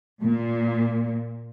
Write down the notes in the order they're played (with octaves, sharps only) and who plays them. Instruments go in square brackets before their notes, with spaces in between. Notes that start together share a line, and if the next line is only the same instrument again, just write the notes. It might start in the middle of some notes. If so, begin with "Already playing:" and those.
[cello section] A#2